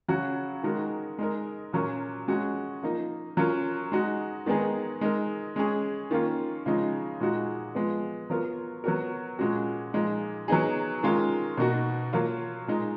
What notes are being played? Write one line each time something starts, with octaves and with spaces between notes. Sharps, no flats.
C#3 F#3 C#4 F#4
D#3 G#3 D#4 F#4 A#4
G#3 D#4 A#4
A#2 F#3 C#4 F4 A#4
G#3 C#4 F#4
F3 A#3 D#4
F#3 C#4 F4 A#4
G#3 D#4 F#4
D#3 G#3 B3 D#4 G#4
G#3 D#4 A#4
G#3 C#4 G#4
D#3 A#3 C#4 F4
C#3 F3 G#3 D#4
A#2 G#3 D#4 F#4
F3 G#3 B3
F#3 B3 F4 A#4
F#3 B3 F#4 A#4
A#2 G#3 C#4 F#4
A#2 F3 G#3 D#4
F#3 B3 D#4 G#4
D#3 G#3 C#4 F4 A#4
B2 A#3 D#4 F#4
F#3 A#3 F4
A#2 G#3 D#4